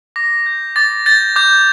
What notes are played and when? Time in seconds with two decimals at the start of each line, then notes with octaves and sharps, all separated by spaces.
0.16 D6 A#6
0.46 G6
0.76 D6 A6
1.06 G6 A6
1.36 D6 G6